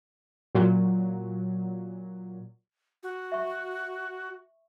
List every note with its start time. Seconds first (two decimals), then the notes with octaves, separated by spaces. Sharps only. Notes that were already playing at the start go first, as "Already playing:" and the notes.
0.55 A#2 F#3
3.03 F#4
3.32 E5 C#6